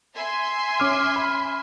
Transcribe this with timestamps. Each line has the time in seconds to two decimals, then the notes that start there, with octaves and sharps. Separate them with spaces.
0.15 E5 G#5 C6
0.80 C#4 D6 F6
1.16 B5